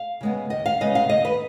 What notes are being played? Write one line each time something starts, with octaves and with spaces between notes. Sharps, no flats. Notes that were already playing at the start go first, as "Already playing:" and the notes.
Already playing: F5
C#3 G#3 B3
D#2 D#5
F5
C#3 G#3 B3 D#5
F5
D#2 D#5
B4